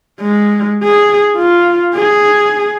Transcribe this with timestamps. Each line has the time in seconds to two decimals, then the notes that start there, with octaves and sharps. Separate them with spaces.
0.21 G#3
0.84 G#4
1.37 F4
1.95 G#4